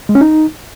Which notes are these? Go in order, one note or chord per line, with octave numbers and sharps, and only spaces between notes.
G#3
C#4
D#4